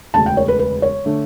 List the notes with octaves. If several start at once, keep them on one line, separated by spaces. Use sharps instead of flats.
E1 D2 C#3 A5
G5
C#5
B4
B4
C#5
D3 A3 D4